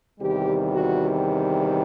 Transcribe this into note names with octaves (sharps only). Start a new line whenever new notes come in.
E2 C3 D#3 G3 G4
F#4